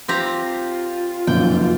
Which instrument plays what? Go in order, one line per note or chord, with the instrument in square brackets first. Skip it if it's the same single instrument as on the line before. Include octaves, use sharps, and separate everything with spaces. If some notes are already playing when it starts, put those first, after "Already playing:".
[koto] C4 G4 A#5 [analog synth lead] F4
[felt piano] F1 F#2 A#2 [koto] G5